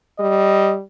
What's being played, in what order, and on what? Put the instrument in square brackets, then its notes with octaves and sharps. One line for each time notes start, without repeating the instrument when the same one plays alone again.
[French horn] G3 [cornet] D#5